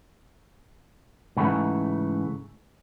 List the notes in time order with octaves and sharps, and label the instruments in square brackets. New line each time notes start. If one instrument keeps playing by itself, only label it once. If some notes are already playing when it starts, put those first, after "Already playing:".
[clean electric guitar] G#2 C#3 E3 G3 A3